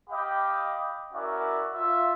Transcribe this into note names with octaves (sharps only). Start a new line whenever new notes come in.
G4 D#5 F5 G5 B5 D6
C#4 E4 F#4 A#4 D5 E5
F4 E5